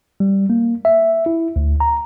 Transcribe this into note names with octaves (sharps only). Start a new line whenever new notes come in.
G3
A#3
E5
E4
D2
A#5